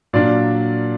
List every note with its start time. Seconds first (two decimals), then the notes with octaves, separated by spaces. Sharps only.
0.13 A#2 F#3 D4 D5 F5